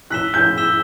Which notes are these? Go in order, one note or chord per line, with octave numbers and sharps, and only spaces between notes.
E6 F#6 B6 E7 G7
G6
E6 B6 E7 G7